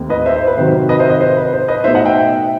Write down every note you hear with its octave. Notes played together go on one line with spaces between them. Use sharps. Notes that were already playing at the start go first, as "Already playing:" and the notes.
Already playing: D#2 D#3 A3 C4
B4 D#5
C5 E5
C5
B4
C3 D#3 F#3 C5
B4 D#5
C5 E5
B4 D#5
C5
B4
C5
B4 D#5
B2 A3 D#4 C5 E5
D#5 F#5
E5 G5